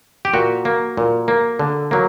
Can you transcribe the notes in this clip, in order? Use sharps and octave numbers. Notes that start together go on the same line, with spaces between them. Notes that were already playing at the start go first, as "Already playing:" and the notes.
G4
A#2 F#4
A#3
A#2
A#3
D3
F#3 A#3